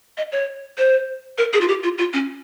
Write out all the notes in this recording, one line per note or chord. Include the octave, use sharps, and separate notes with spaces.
D#5
C#5
C5
A#4
G#4
F4
G4
F4
F4
C#4